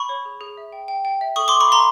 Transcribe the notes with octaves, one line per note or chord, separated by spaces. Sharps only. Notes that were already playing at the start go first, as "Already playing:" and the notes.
Already playing: B5 C#6
C#5
G#4
G#4
E5
G5
G5
G5
E5
A4 C#6 D#6
A4 C6 D6
B5 C#6
F5 A#5 C6